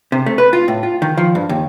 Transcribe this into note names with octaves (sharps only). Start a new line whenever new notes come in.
C3
A3
B4
F4
A2
F4
D#3
F3
G2
D#2